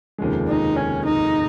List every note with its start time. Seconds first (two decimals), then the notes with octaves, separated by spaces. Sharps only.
0.18 F1 D#2 C#3 F3 G#3
0.48 D#4
0.76 C#4
1.05 D#4